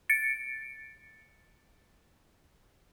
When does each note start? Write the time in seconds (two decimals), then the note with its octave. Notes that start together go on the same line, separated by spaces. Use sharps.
0.09 A6 C#7 D7